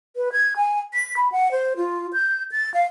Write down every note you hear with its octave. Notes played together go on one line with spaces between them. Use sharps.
B4
G#6
G#5
B6
B5
F#5
C5
F4
G6
A6
F5